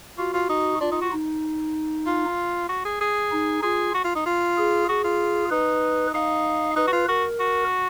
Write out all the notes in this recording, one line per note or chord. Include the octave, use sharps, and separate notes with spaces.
F4 F#4
F4
D#4
D4 F4
D#4
F#4
D#4
F4
F#4
G#4
G#4
D#4
F4 G#4
F#4
F4
D#4
F4
G#4
F#4 G#4
F4
D#4 B4
D#4 F5
D#4 B4
F#4
F4
F#4 A#4
F#4